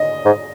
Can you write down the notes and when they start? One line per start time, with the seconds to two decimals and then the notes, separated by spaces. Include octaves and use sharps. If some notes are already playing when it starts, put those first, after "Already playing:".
Already playing: D#5
0.25 G#2